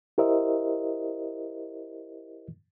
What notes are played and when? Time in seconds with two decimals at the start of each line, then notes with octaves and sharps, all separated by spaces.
0.18 E4 G4 A#4 C5 D#5 E5